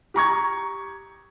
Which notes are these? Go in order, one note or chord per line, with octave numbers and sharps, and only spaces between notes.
G4 A#5 C#6 G#6